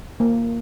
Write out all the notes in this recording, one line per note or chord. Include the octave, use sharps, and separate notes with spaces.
A#3